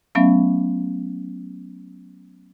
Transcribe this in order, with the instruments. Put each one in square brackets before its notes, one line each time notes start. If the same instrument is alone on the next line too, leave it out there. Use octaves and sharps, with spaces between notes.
[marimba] F#3 A3 B3 C#4 E5 F5